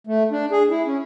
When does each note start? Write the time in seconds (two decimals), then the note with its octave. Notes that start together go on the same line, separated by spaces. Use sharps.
0.07 A3
0.32 D4
0.52 G#4
0.70 E4
0.86 C#4